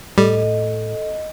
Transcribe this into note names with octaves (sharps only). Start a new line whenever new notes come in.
A2 G3 A4 D#5